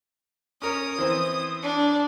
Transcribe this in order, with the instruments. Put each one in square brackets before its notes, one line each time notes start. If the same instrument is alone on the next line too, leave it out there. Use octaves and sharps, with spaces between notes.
[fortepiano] C#4 A#4 C#5 [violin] D#6
[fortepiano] E3 C4 C5
[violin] D4